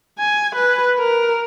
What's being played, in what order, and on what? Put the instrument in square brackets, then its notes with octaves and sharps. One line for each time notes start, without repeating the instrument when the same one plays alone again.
[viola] G#5
B4
A#4